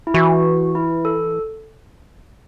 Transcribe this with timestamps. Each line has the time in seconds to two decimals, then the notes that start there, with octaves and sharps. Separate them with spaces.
0.07 E4
0.14 E3 F#4
0.75 E4
1.05 A4